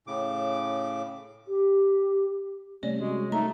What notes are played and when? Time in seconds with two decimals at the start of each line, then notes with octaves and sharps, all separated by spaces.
0.07 A2 C#3 D6
1.48 G4
2.83 C3 G3 A3 C#4 D5
3.00 G#3 F#4
3.32 A3 D#4 A#5